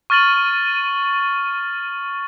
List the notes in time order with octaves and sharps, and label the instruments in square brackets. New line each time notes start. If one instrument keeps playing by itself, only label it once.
[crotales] C#6 F6 A6 D#7 F#7